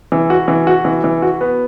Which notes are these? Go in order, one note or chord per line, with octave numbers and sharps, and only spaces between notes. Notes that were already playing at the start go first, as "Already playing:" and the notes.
E3
F#4
E3
F#4
E3
E3
F#4
B3